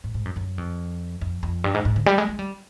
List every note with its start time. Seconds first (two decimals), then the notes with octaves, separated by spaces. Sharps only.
0.04 G#2
0.14 G#2
0.25 F#2
0.36 F#2
0.58 F2
1.21 F2
1.43 F2
1.64 G2
1.74 G#2
1.85 G#2
1.96 D3
2.06 G3
2.18 G#3
2.29 G#3
2.39 G3